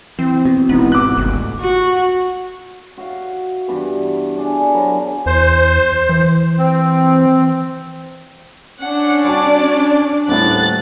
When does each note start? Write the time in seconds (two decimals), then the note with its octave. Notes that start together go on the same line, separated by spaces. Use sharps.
0.19 E3 C4
0.45 B2
0.69 D#1 G#1 G#2 C3 E3 B3
0.92 D6 F#6
1.17 G1 C#2 G#2 A3
1.61 F#4
2.98 F#4 E5 F5
3.68 G2 B2 E3
4.37 D4 G#4 G#5
4.74 F#3 E4 A#4
5.26 E2 C5
6.09 E3
6.59 C4
8.79 C#4 D4 F#5
9.25 G3 F#4 D5 A5
10.28 D#1 A2 F#6 A6